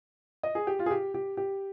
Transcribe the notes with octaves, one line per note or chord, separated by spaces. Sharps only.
D#5
G#4
G4
F4
G#4
G4
G4
G4